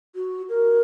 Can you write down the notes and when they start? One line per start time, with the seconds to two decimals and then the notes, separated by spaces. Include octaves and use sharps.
0.15 F#4
0.49 A#4